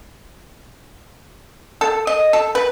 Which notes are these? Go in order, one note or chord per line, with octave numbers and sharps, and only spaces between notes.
A4
D#5
A4
B4